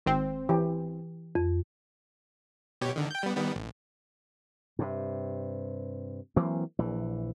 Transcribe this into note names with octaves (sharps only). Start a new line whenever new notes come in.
G#1 C4
E3 G4
F2
B2 G4 C#5
D3 D#3
G5 G6
G3 B3
D#3 G3 B3
A1
G2 C3
E3 F#3 A#3 C4
A#1 E3